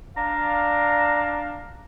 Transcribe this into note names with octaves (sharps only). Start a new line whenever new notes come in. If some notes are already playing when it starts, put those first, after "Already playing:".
D4 F5 A#5